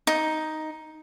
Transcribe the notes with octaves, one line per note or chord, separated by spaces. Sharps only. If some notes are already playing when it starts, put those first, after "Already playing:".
D#4